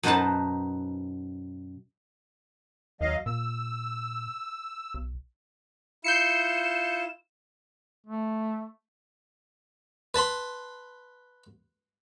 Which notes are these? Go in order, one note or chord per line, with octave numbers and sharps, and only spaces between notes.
F#2 B2 D#4 B4 C5 A5
D#2 F#3 D#5 F5
A#2 E6
B1
E4 F4 G6 C7 C#7 E7
A3
B4 A5 B5 C6